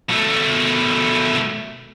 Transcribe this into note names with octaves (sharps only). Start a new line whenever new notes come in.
B2 A3